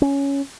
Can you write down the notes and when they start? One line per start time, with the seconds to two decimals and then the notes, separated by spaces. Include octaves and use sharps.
0.02 C#4